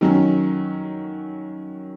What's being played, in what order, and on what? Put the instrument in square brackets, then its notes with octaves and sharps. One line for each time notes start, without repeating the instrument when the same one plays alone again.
[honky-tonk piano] D#3 F#3 C#4